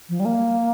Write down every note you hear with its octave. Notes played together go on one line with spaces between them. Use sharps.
F3
G3
A#3